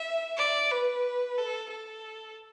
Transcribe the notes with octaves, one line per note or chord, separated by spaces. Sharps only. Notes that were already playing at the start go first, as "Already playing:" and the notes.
Already playing: E5
D5
B4
A4
A4